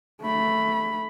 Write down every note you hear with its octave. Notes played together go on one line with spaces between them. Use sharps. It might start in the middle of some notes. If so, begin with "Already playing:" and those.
A3 B5